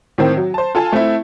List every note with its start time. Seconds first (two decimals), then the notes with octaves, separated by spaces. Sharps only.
0.18 A2 D#3 C4
0.37 F#3
0.54 C5 A5
0.75 F4 A4 G#5 A5
0.92 A3 C4 E4